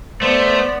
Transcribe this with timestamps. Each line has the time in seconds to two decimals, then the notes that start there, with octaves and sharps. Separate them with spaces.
0.22 A3 B3 C5 D5